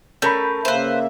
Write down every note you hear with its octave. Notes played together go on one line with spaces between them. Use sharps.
A3 C#4 A4 A#4 B5 G6
C#3 A#3 B4 C5 E5